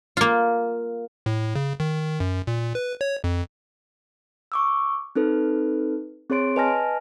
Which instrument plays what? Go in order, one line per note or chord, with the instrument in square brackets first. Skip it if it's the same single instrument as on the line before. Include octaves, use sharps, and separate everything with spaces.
[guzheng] A#3 F4
[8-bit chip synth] A2
C#3
D#3
F#2
A#2
B4
C#5
F2
[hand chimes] C#6 D6 E6
C4 D#4 A4 B4
C4 G#4 C#5 C6 D7
B4 D#5 G#5 A5 F6 A#6